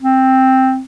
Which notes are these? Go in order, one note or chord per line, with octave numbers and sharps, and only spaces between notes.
C4